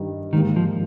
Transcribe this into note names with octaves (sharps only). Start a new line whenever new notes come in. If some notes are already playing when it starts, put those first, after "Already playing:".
Already playing: G2 D#3 G3
G#2 D#3 G3 A#3
F3